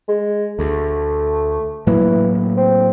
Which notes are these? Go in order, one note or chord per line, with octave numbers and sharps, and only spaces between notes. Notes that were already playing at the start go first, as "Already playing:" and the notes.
G#3
D2 A3
A2 E3 F#3 A#3
C4